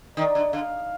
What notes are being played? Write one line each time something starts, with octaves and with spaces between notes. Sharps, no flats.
D#3 D5
D3
D3 F5